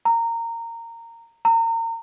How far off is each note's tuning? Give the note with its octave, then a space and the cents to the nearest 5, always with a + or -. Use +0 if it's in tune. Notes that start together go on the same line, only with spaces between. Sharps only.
A#5 -20
A#5 -35